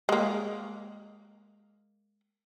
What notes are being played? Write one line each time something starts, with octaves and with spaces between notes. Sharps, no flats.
G#3 A#3